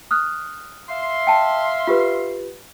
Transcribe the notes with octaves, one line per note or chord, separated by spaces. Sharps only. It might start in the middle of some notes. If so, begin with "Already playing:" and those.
D#6 F6 F#6
E5 F5 C6
G5 A5
F4 G4 B4